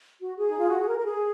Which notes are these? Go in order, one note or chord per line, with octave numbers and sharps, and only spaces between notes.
F#4
G#4
D#4
F4
F#4
G#4
A#4
A#4
G#4